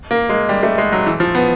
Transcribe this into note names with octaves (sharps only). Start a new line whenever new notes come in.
A#3
G#3
G3
A3
G#3
F#3
E3
F3
B3